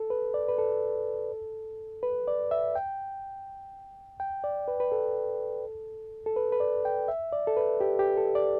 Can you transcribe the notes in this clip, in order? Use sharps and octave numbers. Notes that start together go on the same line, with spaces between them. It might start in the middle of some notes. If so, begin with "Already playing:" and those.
Already playing: A4
B4
D5
B4
A4
B4
D5
E5
G5
G5
D5
B4
B4
A4
A4
B4
B4
D5
G5
E5
D5
A4
B4
G4
G4
A4
D5